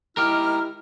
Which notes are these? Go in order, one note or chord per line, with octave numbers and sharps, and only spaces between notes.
D#3 G#3 E4 G4 A#4 F6